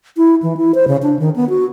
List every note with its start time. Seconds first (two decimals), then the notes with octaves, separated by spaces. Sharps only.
0.17 E4
0.42 E3
0.57 E4
0.75 C5
0.88 C#3
1.03 D4
1.19 D#3
1.36 B3
1.49 F#4